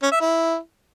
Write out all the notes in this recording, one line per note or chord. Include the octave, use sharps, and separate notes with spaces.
C#4
E5
E4